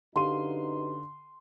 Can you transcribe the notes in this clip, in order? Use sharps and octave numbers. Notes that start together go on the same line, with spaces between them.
F#2 D3 D#4 G4 B4 F5 C6 D#7